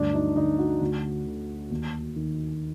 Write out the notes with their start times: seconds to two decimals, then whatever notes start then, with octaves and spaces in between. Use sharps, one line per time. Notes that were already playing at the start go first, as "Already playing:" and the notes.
Already playing: D2 G2 F#3 D4
0.14 D#4
0.36 D3 D#4
0.59 F#4
0.81 D2
1.26 D3
1.70 D#2
2.16 D#3